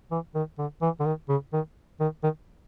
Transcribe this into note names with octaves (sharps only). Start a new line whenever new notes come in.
E3
D#3
D3
E3
D3
D#3
C#3
D#3
D#3
D#3